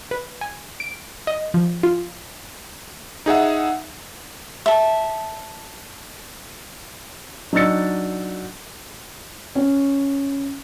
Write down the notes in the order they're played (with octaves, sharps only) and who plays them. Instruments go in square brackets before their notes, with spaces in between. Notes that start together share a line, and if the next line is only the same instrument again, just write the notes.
[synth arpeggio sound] B4
G#5
D7
D#5
F3
F4
[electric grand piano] D#4 G#4 E5 F#5
[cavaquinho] E5 A5
[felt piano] F#3 D4 D#4 E6 A6 C#7
C#4